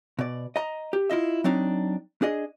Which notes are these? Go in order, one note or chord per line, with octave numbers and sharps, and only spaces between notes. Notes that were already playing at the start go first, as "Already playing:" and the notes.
B2 D5
D#5 A#5
G4
E4 F4 D#5 E5
F#3 C4 D4 D#4
D4 G#4 D#5